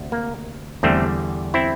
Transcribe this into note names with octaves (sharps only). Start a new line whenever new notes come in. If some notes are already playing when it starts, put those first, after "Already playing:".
Already playing: D2 C3
A#3
E2 D3 G3 A3 C4
C4 E4